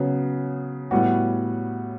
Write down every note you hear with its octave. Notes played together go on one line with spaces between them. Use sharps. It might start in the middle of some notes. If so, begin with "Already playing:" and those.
Already playing: C#3 F#3 B3
A2 G3 B3 F#4